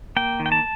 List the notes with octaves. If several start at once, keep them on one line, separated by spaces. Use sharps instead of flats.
A#3 G5
D#3
G5
A5